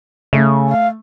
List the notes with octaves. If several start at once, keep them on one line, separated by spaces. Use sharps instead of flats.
C#3 A3
F5